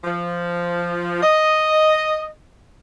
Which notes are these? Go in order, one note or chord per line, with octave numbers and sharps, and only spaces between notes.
F3
D#5